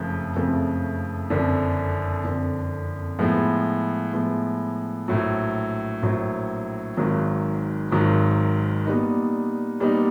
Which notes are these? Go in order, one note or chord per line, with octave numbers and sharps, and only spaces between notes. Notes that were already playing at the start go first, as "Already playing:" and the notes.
Already playing: F#1 F2 C#3 F3 A3
F#1 F2 C#3 F3 A3
F#1 F2 D3
F#1 F2 D3
A2 F3 G#3 B3
A2 F3 G#3 B3
A#1 A2 F#3
A#1 A2 F#3
G#1 G#2 D#3 F#3
G#1 G#2 D#3 F#3
A#2 G3 B3 D#4
A#2 G3 B3 D#4